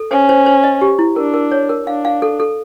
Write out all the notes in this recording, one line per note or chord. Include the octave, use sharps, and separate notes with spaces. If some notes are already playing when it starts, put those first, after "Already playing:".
Already playing: A4
C#4 C5
C5
C5
D#5
G4
E4
D4 A#4
A#4
C#5
A#4
D4 F5
F5
A4
A4